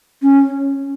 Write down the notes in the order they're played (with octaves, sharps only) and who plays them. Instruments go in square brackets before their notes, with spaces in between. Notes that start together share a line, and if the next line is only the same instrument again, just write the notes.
[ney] C#4